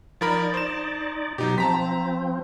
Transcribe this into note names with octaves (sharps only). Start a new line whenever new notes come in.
F3 D#4 A#4 D5 B5
C5 E7
B2 F#3 D#4 G4
F3 C4 A5 A#5 B6